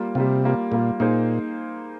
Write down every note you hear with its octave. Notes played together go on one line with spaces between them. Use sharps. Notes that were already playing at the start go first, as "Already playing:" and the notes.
Already playing: G3 A#3 F4
C3 G3 A#3 F4
G3 A#3 F4
A#2 G3 A#3 F4
A#2 A#3 D#4 G#4 C5